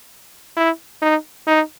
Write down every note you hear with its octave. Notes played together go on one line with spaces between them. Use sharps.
E4
D#4
D#4